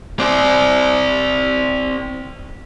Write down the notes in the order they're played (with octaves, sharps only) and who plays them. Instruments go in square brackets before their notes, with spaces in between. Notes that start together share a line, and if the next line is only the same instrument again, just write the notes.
[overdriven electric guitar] C4 D5